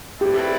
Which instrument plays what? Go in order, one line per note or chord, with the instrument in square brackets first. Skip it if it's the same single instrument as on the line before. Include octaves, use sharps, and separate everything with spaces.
[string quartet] A3 C4 E4 B4 D5 [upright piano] G4